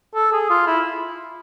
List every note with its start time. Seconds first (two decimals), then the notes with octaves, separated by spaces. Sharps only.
0.15 A4
0.33 G#4
0.50 F4
0.67 E4